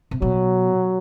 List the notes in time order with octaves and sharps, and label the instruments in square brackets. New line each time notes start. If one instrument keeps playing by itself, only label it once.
[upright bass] C3
[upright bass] B2 [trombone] F#3